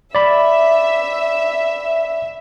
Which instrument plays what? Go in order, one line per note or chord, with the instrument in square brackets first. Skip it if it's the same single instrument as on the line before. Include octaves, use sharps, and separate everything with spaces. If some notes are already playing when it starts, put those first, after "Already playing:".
[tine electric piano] D5 B5 [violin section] E5